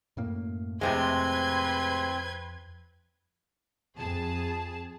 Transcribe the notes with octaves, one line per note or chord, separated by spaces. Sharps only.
F#2 A2 A#3
F2 A2 C3 G#3 C4 B4 C6 G#6
F2 G#4 A5